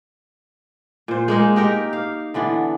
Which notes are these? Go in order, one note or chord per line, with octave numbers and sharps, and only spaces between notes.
A#2 C5
G#3 A#3 D#4
D#4 G4 A#4
F5
D3 E3 B3 D4